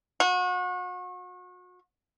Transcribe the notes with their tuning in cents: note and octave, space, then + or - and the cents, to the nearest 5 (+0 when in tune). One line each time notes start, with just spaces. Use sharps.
F#4 -35